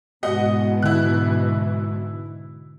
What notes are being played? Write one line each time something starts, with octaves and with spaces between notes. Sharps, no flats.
G#2 B2 E3 F#4 D#5 F#5
D3 E4 F#6